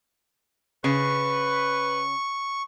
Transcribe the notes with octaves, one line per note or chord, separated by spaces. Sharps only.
C#3 B4 C#6